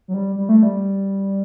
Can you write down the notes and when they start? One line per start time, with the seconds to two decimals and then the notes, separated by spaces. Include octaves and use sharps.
0.08 F#3
0.14 G3
0.36 G3
0.49 A3
0.63 G3